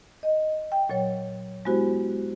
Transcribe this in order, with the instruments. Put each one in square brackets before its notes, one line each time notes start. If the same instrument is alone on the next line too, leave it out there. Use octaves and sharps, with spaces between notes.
[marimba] D#5
G5
A#2 F#3 C#5
G#3 B3 E4 F#4 G4 C5